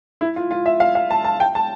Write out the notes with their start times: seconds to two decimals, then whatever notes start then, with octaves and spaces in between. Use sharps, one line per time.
0.21 E4
0.36 F4
0.51 F4
0.66 E5
0.80 F5
0.95 F5
1.11 A5
1.24 A5
1.40 G5
1.55 A5